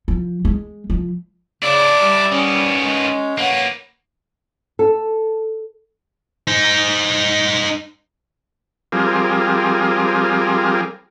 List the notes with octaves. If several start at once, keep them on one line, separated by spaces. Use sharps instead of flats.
F3
G#3
F3
C#3 D4 E4 D5
G3
D#3 B3 C#4
G#3
A#3 B4 C#5 F#5
A4
D#4 C5
F3 G3 C4 G#4 A#4